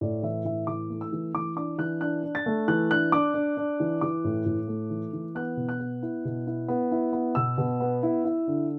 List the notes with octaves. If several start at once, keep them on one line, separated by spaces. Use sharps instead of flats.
A2 D5
E3 E5
A2 E5
E3 D6
A3
E6
E3
E3 D6
D4 D6
E3 F#6
D4 F#6
D4
A6
A3
E3 F#6
D4 F#6
D4 D6
D4
D4
E3
E3 D6
A2
A2
A3
E3
E3
B3 F#6
B2
F#6
B3
E4
B2
E4
B3
E4
B3
B2 E6
B2
B3
E4
E4
D3